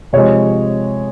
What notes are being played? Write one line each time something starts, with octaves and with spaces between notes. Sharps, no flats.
C3 F3 G#3 C#5